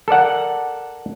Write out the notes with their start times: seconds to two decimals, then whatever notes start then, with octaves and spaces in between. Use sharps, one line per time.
0.08 A4 A#4 D5 F#5